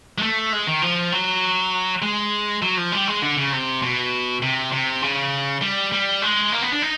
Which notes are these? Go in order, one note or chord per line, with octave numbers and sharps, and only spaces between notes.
G#3
A3
G#3
D#3
F3
F#3
G#3
F#3
F3
G3
G#3
D3
C#3
C3
B2
C3
C3
C#3
G3
G3
G#3
A#3
B3
D4
D#4